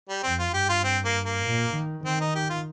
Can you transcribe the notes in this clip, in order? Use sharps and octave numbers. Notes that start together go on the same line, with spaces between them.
G3
F2 C4
F4
G2 G4
F4
C4
A#3
A#3
A#2
D#3
D#3 C4
D#4
G4
F4